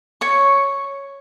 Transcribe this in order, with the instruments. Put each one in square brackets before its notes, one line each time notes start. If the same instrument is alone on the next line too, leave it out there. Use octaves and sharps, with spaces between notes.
[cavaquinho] C#5 C#6